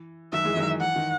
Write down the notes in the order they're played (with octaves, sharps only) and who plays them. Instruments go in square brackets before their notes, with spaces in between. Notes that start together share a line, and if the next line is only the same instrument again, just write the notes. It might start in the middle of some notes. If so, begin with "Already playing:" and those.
Already playing: [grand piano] E3
[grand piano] D#3 F#3 [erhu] E5
[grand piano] E3 G#3
D#3 F#3
E3
[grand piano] E3 [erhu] F#5
[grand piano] D#3